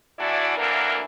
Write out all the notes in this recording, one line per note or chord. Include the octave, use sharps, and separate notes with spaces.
E2 E3 D4 E4 F#4 D5
D2 E3 F#3 A#3 D4 A#4